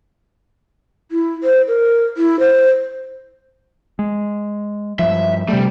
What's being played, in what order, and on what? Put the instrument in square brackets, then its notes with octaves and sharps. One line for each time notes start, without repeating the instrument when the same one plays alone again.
[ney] E4
C5
A#4
E4
C5
[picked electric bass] G#3
[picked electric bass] G2 F3 [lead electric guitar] E5
[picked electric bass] C3 A3 [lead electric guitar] G3